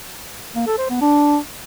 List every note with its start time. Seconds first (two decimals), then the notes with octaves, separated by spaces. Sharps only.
0.55 A#3
0.67 A4
0.78 C5
0.90 B3
1.01 D4